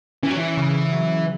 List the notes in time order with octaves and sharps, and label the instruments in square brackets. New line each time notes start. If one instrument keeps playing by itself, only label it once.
[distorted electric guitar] E3 [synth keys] C#4
[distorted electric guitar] F#3
E3
[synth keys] C#3
F#3